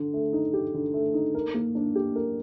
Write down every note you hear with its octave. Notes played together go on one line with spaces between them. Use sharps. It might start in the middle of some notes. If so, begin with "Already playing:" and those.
Already playing: D3
A3
D#4
G4
D3
A3
D#4
A#4
A#3
D4
G4
A#4